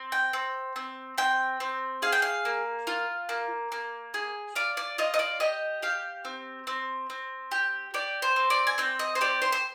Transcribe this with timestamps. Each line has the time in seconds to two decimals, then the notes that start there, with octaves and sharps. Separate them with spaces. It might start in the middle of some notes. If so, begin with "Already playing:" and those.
Already playing: C4
0.12 G5
0.33 C4
0.76 C4
1.18 C4 G5
1.60 C4
2.02 G#4 F5
2.12 G5
2.22 F5
2.45 A#3
2.87 F4
3.29 A#3
3.72 A#3
4.14 G#4
4.55 F4 D5
4.77 D5
4.98 F4 D#5
5.14 D#5
5.19 D5
5.40 G4 D#5
5.82 G4 F5
6.25 C4
6.67 C4
7.10 C4
7.51 G4
7.94 G4 D5
8.22 C5
8.36 C4
8.50 D5
8.67 G#5
8.78 C4 G5
8.99 D#5
9.15 C5
9.21 G4 D5
9.42 C5
9.52 C5